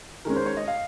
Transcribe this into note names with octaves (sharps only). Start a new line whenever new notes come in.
D#3 G#3 C#4 A#4
C5
C#5
D#5
F5